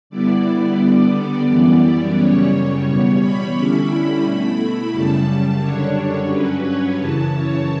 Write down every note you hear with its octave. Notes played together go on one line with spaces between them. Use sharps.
D3 G3 B3 E4 D5
D3 G3 B3
F#2 E3 G3 B3
F#2 C#3 G3 C#5
E2 B2 G3 C#5
B5
D3 G3 C#4 E4
B2 A3 E4
F#2 C#3 G3 A5
F#2 D3 G3 D4 C#5
G2 F#3 C#4 B4
C#5
F#2 C#3 E3 A5
C#5